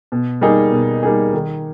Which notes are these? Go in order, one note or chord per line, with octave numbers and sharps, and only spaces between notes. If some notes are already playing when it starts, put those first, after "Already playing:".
B2
G3 A#3 D#4 G#4
B2
G3 A#3 D#4 G#4
D#3